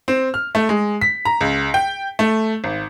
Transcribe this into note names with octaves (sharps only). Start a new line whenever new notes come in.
C4
F6
A3
G#3
B6
A#5
C#2
G5
A3
G#1